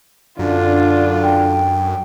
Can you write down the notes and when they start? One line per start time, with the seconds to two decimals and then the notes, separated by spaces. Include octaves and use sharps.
0.39 F#2 D3 D4 F4
1.23 G5